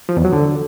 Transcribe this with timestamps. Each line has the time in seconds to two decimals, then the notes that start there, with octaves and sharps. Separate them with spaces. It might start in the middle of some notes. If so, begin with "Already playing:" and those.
0.09 F3
0.17 E2
0.25 F#3
0.33 D3